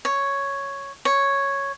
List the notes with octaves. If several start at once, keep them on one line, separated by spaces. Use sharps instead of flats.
C#5
C#5